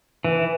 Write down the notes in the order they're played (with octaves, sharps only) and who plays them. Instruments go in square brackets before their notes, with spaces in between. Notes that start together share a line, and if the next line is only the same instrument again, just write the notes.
[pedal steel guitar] E3